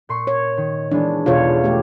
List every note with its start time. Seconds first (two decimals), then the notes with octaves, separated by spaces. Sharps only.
0.09 A#2 C6 C#6
0.27 C#5
0.57 D#3
0.92 E3 G#3 B3 D4
1.26 B1 E2 B2 F4 C#5
1.64 A3 G4